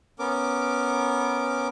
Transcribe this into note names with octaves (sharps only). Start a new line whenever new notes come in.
B3 C#4 A#4 D6